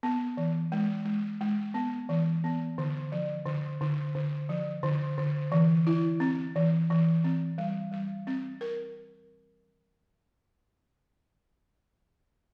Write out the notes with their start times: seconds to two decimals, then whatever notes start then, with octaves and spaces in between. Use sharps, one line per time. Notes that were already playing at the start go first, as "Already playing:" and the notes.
0.03 B3
0.37 E3
0.72 G#3
1.05 G#3
1.41 G#3
1.74 B3
2.09 E3
2.44 B3
2.78 D3
3.12 F3
3.46 D3
3.81 D3
4.15 D3
4.49 F3
4.83 D3
5.18 D3
5.52 E3
5.87 E4
6.20 C4
6.56 E3
6.90 E3
7.24 C4
7.58 G3
7.92 G3
8.27 C4
8.61 A#4